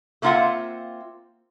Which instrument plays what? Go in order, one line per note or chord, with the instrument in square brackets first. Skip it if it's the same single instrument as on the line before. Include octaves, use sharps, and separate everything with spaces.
[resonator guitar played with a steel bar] A3 A#3 C4 F4 E5 F#5